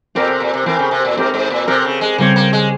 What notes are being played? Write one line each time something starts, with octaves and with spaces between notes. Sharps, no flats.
A#2 C4 G4 A#4
C3
A#2
C3
E3 C4 G4 A#4
C#3
C3
A#2
G#2 C4 G4 A#4
G#2
A#2
C3 C4 G4 A#4
C#3
G#3
C#3 G3 A#3 C4 G4 C#5
A#3
G#3